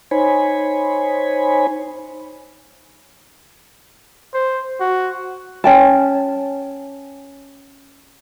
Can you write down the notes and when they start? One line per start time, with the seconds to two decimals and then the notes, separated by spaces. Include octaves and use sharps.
0.11 D#4 C5 C#5 G#5 B5
4.34 C5
4.80 F#4
5.64 C#4 G5 A5